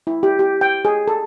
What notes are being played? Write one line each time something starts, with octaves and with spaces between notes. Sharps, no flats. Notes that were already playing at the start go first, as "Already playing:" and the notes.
E4
G4
G4
G5
G#4
A4